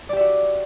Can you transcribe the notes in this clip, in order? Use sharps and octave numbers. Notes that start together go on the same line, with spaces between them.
F#4 G4 D5 E5